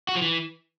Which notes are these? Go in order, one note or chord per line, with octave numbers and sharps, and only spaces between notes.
F#4
F3
E3